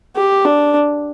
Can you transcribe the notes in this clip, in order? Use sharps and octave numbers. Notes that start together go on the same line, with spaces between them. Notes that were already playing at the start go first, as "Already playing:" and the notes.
G4
D4